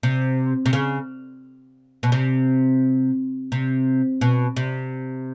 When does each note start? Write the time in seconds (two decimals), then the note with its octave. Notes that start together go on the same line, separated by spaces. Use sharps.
0.03 C3
0.66 C3
0.73 C#3
2.03 B2
2.12 C3
3.52 C3
4.21 B2
4.56 C3